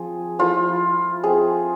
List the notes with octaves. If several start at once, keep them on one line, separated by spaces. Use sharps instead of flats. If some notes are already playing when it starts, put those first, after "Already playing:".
Already playing: F3 C4 G#4
F3 A3 E4 F4
F3 A3 C4 G#4